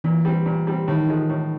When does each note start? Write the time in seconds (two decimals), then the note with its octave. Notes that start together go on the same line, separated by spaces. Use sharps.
0.04 A#2 E3
0.25 G3 C4
0.46 A#2
0.67 G3 C4
0.88 A2 D#3
1.08 F3 G#3
1.29 A2